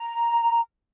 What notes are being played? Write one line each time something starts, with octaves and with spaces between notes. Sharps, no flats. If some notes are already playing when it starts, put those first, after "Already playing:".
Already playing: A#5